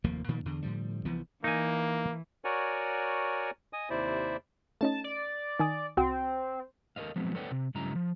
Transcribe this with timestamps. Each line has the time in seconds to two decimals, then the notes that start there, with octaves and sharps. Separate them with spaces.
0.04 F1 D#2 F3 A#3
0.28 A#2 D#3 F3 A#3
0.45 E2 D3
0.62 A2 D3 F3 G3
1.05 C2 E3 F3 B3
1.44 E3 A#3 D#4 G#5
2.45 F#4 A#4 C#5 D5 F#5 G#5
3.73 D#5 G#5 D#6
3.90 D#2 C3 E4 C5 D5 E5
4.81 A3 C#4 D#4 A5
5.04 D5
5.59 D#3 G#5 D#6
5.97 C2 C4 F#4 G5
6.96 A4 A#4 C5 D#5 F5
7.16 F3 F#3 G#3 B3 C4
7.35 A4 B4 C#5 D5 F#5 G5
7.51 C3
7.75 G2 C#3 F#3 G#3 E4 A#5
7.95 F3